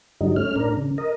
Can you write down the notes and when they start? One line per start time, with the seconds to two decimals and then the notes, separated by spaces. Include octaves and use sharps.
0.21 G2 D3 F#3 G3 D#4
0.36 A3 C#4 F6
0.56 A2 D4 A#4
0.77 C#3
0.98 A#4 D#5